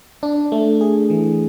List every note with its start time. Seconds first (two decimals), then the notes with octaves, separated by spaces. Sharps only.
0.23 D4
0.52 A3
0.81 G#4
1.10 E3